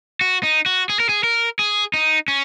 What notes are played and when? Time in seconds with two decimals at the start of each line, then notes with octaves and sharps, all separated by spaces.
0.21 F#4
0.43 D#4
0.66 F#4
0.89 G#4
1.00 A#4
1.09 G#4
1.24 A#4
1.59 G#4
1.94 D#4
2.28 C#4